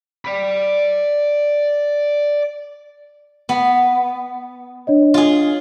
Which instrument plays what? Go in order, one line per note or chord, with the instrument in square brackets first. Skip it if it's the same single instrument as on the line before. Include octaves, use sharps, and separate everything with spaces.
[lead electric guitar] D5 B5
[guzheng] B3
[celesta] D4 C#5 D#5
[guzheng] F4 G#4